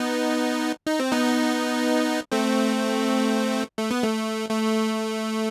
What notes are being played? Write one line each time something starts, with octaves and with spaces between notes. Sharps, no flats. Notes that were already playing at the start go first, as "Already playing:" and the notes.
Already playing: B3 D#4
D#4
C4
B3 D#4
A3 C4
A3
B3
A3
A3